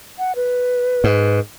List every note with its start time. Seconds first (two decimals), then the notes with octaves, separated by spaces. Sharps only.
0.19 F#5
0.36 B4
1.04 G#2